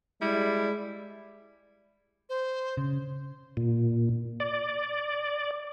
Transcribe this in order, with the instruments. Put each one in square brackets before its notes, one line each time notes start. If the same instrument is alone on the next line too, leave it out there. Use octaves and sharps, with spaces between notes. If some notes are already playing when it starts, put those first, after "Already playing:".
[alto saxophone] G3 [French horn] G#3 [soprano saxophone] E4 [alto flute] D5
[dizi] C5
[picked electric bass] C#3
[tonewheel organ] A#2
D5